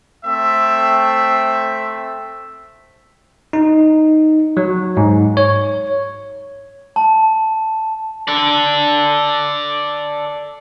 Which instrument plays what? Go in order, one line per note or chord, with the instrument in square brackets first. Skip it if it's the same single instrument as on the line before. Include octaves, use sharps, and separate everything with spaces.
[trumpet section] A3 C4 E5
[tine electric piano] D#4
F#3
G#2
C#5
[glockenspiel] A5
[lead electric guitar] A4 D5